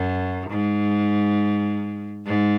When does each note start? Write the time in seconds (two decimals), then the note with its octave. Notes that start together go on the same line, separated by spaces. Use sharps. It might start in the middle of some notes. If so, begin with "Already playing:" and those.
Already playing: F#2
0.50 G#2
2.26 G#2